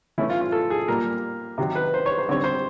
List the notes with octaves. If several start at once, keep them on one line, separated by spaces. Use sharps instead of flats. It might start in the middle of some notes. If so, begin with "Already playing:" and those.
E3 A3 C#4 E4
F4
F4
A4
G#4
A#2 G3 A#3 A#4
C3 D#3 F#3
B4
C5
C#5
C5
D3 G3 C4 C#5
C5